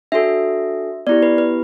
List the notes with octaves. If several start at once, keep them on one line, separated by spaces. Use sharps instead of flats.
D4 F#4 A4 E5
B3 E4 G4 D5
B4
B4